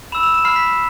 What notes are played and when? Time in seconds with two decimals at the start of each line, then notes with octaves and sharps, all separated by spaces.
0.12 B5 E6 E7
0.23 F7
0.34 E7
0.45 B5 F6 C7
0.56 B6